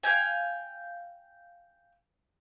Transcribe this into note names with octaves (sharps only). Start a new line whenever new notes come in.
F5 G5 G#5